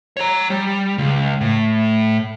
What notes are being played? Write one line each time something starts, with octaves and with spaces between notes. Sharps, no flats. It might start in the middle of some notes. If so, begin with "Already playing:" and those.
C#5 A#5
G3
C#2
A2